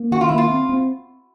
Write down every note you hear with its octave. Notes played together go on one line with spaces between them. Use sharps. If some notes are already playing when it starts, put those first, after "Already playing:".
Already playing: A#3
D#3 F#4
F4
A#3 E4
F4
C4
C4